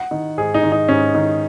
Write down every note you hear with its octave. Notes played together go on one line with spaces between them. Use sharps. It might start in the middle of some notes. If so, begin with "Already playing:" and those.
Already playing: F#5
D#3
G#2 G#4
D#4
D#3
D#4
G#2 C#4
D#3